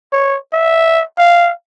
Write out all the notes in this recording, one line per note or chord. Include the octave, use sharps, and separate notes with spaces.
C#5
E5
F5